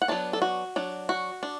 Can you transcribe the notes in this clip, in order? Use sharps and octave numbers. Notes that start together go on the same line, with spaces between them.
F#5
F#3 B3 D4 A5
A4
F#4
F#3 D4
F#4
D4